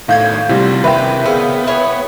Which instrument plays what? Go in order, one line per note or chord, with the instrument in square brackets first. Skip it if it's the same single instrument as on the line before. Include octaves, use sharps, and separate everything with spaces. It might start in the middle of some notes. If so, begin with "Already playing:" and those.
[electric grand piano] A2 G6 G#6 [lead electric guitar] D#3 A3 [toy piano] F5
[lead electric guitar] D2 F4 [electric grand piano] C3 G3 [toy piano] E4
[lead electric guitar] D#2 C3 [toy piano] A#4 E5 B5 [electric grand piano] B4 G5
[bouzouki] A#2 C#3 C5 [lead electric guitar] B3 [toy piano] E6
[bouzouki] E4 G#4 C#5